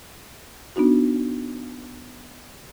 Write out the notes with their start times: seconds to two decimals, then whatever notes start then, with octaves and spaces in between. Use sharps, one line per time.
0.76 B3 D4 D#4 F#4